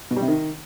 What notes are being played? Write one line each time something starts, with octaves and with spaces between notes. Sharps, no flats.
B2
G3
C3
D#3